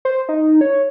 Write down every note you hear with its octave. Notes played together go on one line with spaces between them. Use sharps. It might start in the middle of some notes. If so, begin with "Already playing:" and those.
C5
D#4
C#5